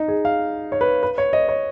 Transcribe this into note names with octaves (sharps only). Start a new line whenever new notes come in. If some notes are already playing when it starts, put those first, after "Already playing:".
Already playing: D#4
G#4
F5
C#5
B4
B4
C#5
D#5
C#5